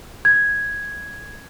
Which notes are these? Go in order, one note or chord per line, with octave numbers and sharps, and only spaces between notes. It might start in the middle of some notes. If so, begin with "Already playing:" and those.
G#6